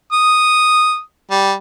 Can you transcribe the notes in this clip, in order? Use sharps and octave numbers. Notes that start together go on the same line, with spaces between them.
D#6
G3